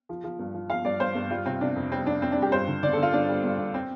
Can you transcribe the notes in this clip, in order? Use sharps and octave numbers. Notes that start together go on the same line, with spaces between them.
F3
F3
G2
F3
F3 F5
G2 D5
G2 C5
G2
G3 F4
C3 C4
C3 D4
F2
G3 C4
F2 D4
F2 C4
D4
G3
G4
G2 C5
D3
D3 D5
A4
D3 F4
G2 D4
G3
G2
G2
C4